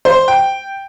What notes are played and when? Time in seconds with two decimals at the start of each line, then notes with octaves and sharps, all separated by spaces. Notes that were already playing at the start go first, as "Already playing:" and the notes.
0.05 C5
0.28 G5